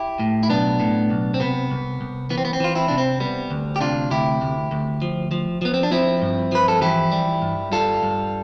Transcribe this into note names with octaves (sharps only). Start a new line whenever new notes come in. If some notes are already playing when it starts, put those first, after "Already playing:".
Already playing: E4 G4
A2
E4
B1 B3 D4
A2
B1
C4
C3 B3
C2
C2
E3 B3
C4
B3
C4
E3 F4
C4 E4
C3 D4
C4
G3 B3
D2
G4
C3 D4 F4
D2 E4 G4
D2
D2
F3
F3
F3 B3
C4
D4
F3 C4 E4
G2
F3 B4
A4
E3 E4 G4
G3
G2
G3 F4 A4
G2